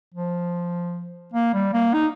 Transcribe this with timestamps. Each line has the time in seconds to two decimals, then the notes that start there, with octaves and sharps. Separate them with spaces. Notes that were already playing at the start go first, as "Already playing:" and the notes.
0.14 F3
1.34 A#3
1.54 G3
1.74 A#3
1.94 D#4